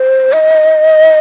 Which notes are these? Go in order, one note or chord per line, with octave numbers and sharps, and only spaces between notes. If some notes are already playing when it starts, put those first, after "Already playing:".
Already playing: C5
D#5